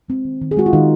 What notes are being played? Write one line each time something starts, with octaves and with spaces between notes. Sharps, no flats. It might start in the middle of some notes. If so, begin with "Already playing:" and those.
G#3 C4
D#3
D#3
G#4
G#3 F#4
F4
D#3 G#3 D#4